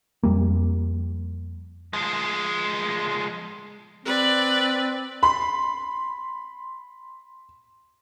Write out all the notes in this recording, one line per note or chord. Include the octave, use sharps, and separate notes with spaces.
F2 G3 A#3
F3 G#3
C4 B4 D5
B5 C6